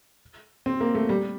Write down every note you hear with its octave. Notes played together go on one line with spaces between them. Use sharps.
C4
A#3
A3
G3